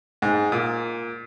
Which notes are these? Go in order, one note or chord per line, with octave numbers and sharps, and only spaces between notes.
G#2
A#2